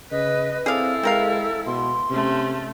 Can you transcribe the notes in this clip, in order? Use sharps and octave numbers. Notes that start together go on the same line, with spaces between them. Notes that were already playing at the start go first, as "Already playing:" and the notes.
C#3 B4 D#5
C4 E4 G#4 A4 D5 F5
G#3 C4 A#4 F5
B2 C6
C3 A3 C#4